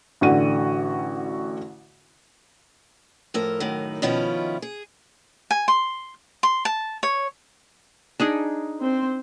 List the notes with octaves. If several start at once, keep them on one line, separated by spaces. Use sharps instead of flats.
A1 D3 F#4 D#7
A2 F3 A4 A#4
F#2 A2 D#3
B2 D#3 F3 C#4 E4 F4
G#4
G#5
C6
C6
A5
C#5
D4 D#4 G#4
C4 C5